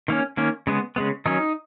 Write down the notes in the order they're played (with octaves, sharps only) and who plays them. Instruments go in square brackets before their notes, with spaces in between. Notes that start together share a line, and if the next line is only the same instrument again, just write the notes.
[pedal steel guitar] D#3 A#3 C#4
D#3 A#3 C#4
C#3 G#3 B3
C#3 G#3 B3
D#3 F#3 C#4 D#4